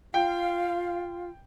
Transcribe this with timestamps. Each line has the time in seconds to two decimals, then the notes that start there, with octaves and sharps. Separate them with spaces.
0.14 F4 F5 G5